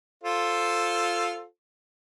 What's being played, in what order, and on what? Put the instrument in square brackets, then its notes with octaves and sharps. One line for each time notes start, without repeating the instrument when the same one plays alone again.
[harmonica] F4 A4 C5